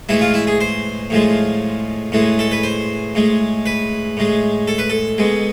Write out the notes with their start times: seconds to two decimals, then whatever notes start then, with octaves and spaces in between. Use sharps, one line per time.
0.09 A2 E3 G#3 E4
0.21 F4
0.34 E4
0.47 G#4
0.61 C5
1.10 A2 F3 G#3
2.12 A2 E3 G#3
2.39 A4
2.51 B4
2.63 C5
3.15 A2 G#3
3.66 B4
4.17 A2 G#3
4.68 A4
4.78 B4
4.90 A4
5.18 B2 G#3